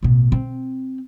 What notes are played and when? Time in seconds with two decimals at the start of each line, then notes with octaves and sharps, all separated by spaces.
0.03 A1 B2
0.32 C4